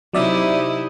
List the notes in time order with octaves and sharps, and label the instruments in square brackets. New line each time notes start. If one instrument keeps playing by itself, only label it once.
[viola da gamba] C3 D#4 E4 [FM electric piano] F#3 D5 E5